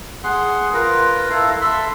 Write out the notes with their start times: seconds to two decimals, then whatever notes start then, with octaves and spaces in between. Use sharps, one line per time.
0.24 G#4 F#5 C6
0.74 F4 A#4 B4
1.30 E4 A4 F5 A#5
1.61 A4 E5 B5 C6